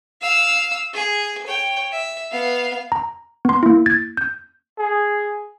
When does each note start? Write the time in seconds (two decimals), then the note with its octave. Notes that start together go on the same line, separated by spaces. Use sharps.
0.21 F5 E6
0.93 G#4
1.46 C#5 G5
1.91 E5
2.31 B3 F5
2.92 A#5
3.45 B3 C6
3.63 A#3 E4
3.86 G#6 A6
4.17 G6
4.78 G#4